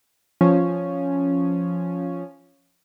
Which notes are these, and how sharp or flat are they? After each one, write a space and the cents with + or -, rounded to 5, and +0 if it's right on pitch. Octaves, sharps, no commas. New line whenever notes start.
F3 +0 C#4 +0